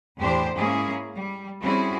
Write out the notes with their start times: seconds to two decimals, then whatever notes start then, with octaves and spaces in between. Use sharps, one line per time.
0.19 E2 A2 D4 G4 C5
0.56 G#2 A#3 C#4 E4 G#4
1.15 G3
1.60 G3 C4 C#4 E4 F#4 G#4